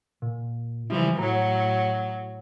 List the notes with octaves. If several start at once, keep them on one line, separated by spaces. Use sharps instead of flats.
A#2
C#2 E3 F3 G3 E4
A2 F#3 A#5